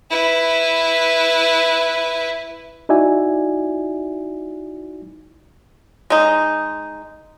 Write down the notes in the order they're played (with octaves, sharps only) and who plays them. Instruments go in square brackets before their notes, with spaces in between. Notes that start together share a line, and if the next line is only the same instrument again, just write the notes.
[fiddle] E4 B4
[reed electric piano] D#4 E4 F#4 D5 E5 G#5
[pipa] G#3 D#4